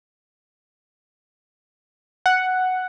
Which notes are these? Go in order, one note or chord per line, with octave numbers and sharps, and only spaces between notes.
F#5